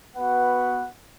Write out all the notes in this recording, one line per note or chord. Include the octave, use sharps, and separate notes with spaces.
B3 F#4 B4 F#5